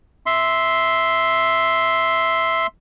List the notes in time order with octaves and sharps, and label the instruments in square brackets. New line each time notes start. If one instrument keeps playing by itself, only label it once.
[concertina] E5 C6